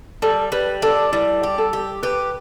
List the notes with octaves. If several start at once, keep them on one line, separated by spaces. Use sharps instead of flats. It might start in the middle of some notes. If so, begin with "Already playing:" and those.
G3 A4
G3 B4
D4 A4
G3 E4
G4
A4
G4
G4 B4